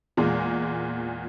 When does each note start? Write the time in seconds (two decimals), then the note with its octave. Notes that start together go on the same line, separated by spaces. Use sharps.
0.17 E2 A#2 G#3